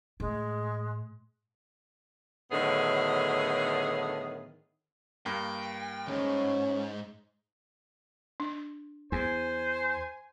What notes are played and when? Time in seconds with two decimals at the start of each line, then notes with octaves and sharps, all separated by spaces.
0.20 A2 G#3
2.51 A2 D3 D#3 F#3 B3 G#4
5.26 G2 A#3 G5
6.08 D#2 G#2 C#4
8.40 D4
9.12 E2 C5 G#5